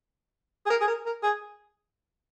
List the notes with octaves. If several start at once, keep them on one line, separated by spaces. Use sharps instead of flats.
G#4
A#4
G#4
A#4
A#4
G#4